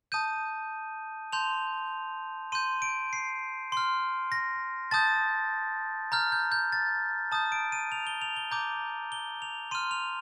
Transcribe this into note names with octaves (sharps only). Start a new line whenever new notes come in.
A5 D#6 G6 D#7
A5 C6 G6 F7
C6 G6 D#7
D7
C7
C6 F6
A#6
A5 D#6 G6 A6
A#5 F6 G6
G6
G6
A6
A5 D#6 G6
D7
D#7
F7
G7
F7
G7
A#5 D6 G6
G7
F7
C6 F6 D#7
F7